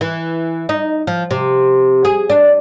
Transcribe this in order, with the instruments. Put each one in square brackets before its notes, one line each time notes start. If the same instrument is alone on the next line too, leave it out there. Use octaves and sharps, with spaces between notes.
[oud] E3
D#4
F3
C3
G#4
D4